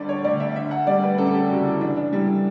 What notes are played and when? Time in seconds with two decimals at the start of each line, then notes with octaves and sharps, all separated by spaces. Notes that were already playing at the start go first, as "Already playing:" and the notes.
Already playing: D2 D3 G3 D5
0.09 C#5
0.24 D2 D5
0.40 E5
0.55 D3 E5
0.71 F#5
0.87 G3 D5
1.03 B4
1.18 F#2 A4
1.34 G4
1.49 F#1 F#4
1.65 E4
1.81 E3 D4
1.97 D4
2.13 G3 E4